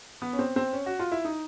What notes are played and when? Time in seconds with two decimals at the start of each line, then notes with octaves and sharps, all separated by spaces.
0.22 B3
0.33 C#4
0.39 C4
0.56 C4
0.73 C#4
0.86 F#4
0.99 F4
1.12 E4
1.25 D#4